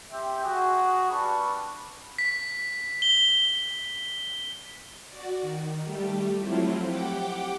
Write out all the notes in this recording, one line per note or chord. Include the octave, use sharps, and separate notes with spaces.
C4 G4 E5 G5
F#4 G#4
G3 D4 B4 A5 B5 C#6
B6
G7
F#4 D5
D#3
G3 A3 G4
F3 F#3 A3 C4 E4 F4
G4 F#5 G5 D6